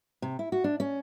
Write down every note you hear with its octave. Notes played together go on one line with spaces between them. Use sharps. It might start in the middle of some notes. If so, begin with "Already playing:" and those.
C3
E4
F#4
D4
C#4